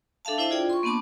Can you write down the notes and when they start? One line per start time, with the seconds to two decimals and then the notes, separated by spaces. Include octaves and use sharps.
0.25 D4 A4 E5 F5 A5
0.38 D4 E4 C5 D#5 E5
0.51 F4 G#4 D5 G5
0.70 C6 C#6
0.83 A#3 B3 D4 A5 D6